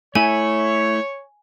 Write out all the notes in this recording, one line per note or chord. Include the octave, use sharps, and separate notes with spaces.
A3 E4 C#5 G#5